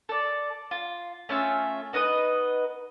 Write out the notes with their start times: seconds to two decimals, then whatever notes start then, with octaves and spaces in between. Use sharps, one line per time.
0.09 A4 D5
0.71 F4
1.29 A3 C#4 F4 E5
1.93 B3 D#4 B4 D#5